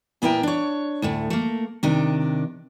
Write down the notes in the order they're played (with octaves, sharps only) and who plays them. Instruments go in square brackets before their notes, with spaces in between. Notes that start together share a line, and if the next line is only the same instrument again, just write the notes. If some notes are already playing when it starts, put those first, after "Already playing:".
[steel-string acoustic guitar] A#2 B3 E4 A#4 G5
D4 C#5
D2 A2 A3
A3 A#3
C3 D#3 D4